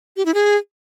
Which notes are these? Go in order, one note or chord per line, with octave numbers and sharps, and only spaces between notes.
G4
E4
G#4